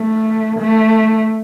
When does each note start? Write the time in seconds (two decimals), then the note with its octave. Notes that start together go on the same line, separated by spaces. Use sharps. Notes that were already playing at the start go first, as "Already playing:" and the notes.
Already playing: A3
0.59 A3